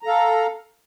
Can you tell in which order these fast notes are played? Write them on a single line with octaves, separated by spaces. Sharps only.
A#5 A4 F5